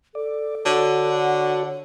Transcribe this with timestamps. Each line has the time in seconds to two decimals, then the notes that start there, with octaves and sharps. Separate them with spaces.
0.15 A4 D5
0.66 D3 F#4 C#5
1.15 F#5
1.66 C#5